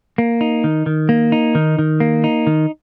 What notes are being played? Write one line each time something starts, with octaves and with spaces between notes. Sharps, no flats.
A#3
D#4
D#3
D#3
A#3
D#4
D#3
D#3
A#3
D#4
D#3